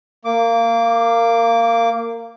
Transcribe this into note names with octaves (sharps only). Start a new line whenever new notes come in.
A#3 D6